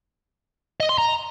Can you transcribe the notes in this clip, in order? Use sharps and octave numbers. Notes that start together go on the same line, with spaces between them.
D#5
C6
A#5